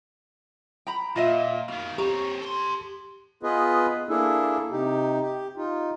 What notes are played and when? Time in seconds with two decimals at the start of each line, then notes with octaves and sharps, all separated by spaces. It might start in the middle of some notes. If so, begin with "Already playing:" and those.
0.87 G5 A#5 B5
1.16 A#2 F4 D#5 E5
1.68 B2 D#3 F5
1.98 C4 G4 C#5 A#5
2.41 A4 C6
3.43 B3 F4 G#4 B4 D#5
4.09 A#3 D4 E4 G#4 A4
4.71 C3 D#4 G4
5.21 G4
5.57 D#4 F4